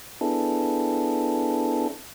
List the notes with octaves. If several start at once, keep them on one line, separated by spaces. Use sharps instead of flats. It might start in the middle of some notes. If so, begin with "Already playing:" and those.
B3 D4 E4 G#4 A4